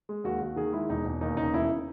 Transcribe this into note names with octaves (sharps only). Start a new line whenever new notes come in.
G#3
D#2 F#4
D#2 F#4
D#3 G#4
G#3 E4
E1 D#4
E1
D#2 D#4
C#3 D#4
E1 E4